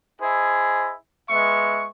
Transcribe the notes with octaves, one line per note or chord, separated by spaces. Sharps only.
E4 G#4 C5 D#5
G#3 B3 E5 C#6